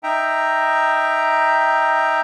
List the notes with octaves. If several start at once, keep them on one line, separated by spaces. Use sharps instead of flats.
D#4 E5 G5 A#5